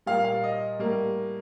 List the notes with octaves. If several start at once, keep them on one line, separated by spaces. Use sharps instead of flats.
A#2 G3 A#3 F5
F5
D#5
A2 G3 A#3